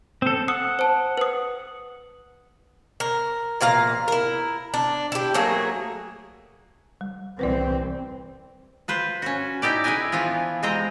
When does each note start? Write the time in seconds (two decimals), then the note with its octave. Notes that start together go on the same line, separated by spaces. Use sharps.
0.22 C4 A4
0.48 F#5 D#6
0.79 C5 A5
1.17 B4 D#6
3.00 A#4
3.61 A#2 E3 F5 A#5
4.08 E4 A#4
4.74 D4
5.12 E4 G4
5.34 F#3 A3 A#3 G#4
7.01 G3
7.39 C2 E3 C4 B4 C5 D5
8.88 F4 B4 C5
9.22 C#4 F#4
9.62 D#4 E4 G4 D5
9.84 E4 G#4 B4 D5 D#5 G#5
10.12 E3 F3 B3 F4
10.62 C3 G#3 C4 C5 D#5 A#5